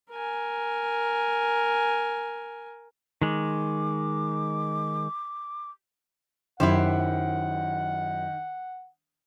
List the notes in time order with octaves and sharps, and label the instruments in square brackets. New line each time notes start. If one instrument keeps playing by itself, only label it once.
[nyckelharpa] A#4 G#5
[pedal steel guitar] D#3 G#3 [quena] D6
[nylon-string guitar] F#2 [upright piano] D#3 [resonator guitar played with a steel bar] E4 G4 C5 [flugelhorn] F#5